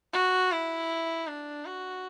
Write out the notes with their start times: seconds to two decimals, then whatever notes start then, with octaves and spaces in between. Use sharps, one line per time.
0.13 F#4
0.52 E4
1.27 D4
1.65 F#4